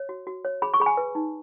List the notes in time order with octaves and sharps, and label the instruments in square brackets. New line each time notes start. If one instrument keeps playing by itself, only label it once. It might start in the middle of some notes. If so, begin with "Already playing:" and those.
Already playing: [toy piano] C#5
F#4
F#4
C#5
G#4 B5
C#6
G#4 B5
G#5
B4
D#4